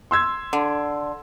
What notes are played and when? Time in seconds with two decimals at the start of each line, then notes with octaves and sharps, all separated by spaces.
0.11 C6 E6 G#6
0.53 D3